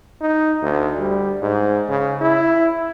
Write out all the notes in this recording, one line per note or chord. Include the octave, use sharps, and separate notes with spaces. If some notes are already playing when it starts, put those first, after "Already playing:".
D#4
D2
G3
G#2
C#3
E4